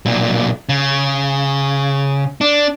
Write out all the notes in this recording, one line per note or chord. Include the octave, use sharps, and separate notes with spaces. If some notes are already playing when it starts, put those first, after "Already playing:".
B1 A#2
C#3
D4